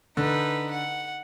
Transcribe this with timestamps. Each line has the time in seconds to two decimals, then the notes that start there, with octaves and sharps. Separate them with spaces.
0.17 D3 D#4 B4
0.71 F#5